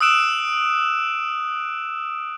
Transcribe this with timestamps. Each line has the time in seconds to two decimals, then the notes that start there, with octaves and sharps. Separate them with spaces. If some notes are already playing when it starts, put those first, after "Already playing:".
0.01 D#6 E6 F#6 D7 E7